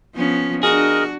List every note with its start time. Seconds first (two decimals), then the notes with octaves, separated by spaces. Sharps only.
0.15 F3 B3 C#4
0.63 D4 F#4 G#4 A#4 D#5